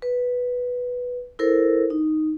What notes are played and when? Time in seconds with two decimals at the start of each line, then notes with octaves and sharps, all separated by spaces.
0.02 B4
1.39 E4 A4 A#4 C5
1.90 D#4